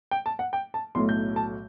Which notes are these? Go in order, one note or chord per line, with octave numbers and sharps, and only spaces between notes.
G5
A5
F#5
G5
A5
B1 A2 F#3 A3 C6
G6
A5